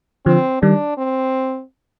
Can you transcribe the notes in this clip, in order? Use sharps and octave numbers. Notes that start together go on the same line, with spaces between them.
D3 F3 C4
D#3 G3 D4
C4